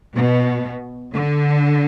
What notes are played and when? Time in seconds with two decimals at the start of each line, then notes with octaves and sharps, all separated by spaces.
0.15 B2
1.13 D3